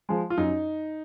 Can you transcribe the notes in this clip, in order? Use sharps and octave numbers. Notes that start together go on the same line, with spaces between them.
F3 G#3
F4
F#2 D#4